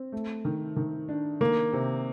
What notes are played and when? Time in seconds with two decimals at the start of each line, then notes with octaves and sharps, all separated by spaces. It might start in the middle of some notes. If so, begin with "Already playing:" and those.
Already playing: C4
0.12 A3
0.45 D#3
0.77 D#3
1.09 D4
1.41 D#3 A#3
1.73 C3